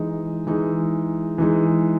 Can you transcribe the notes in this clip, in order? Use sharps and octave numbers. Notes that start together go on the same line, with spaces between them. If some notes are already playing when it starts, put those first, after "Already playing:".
Already playing: E3 G#3 D#4
E3 G#3 D#4
E3 G#3 D#4